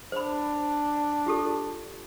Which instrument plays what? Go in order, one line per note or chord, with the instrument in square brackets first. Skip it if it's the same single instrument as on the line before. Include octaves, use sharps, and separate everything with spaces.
[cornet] D4 [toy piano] C5 B5
[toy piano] F4 G4 A4